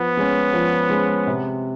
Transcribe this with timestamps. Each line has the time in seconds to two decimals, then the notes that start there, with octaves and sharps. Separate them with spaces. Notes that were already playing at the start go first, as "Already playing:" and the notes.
Already playing: F3 B3
0.17 G#3 C#4
0.53 F3
0.90 G#3 C#4
1.27 C3